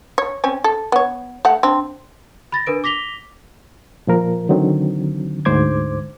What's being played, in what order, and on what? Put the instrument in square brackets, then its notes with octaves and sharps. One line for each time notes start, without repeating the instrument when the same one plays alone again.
[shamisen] C#5
C4 C#4 G#5
A4
B3 C#5
A3 F#5
C4 D4
[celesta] B5 A6 A#6
D4 A#4 B4 D7
D6 A#6 B6 F7 G7
[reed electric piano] A#2 F3 A#4
D3 D#3 F#3 C4
D2 G#2 C5 D6 G#6